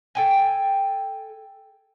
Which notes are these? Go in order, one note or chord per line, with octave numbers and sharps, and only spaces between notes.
A4 G5 G#5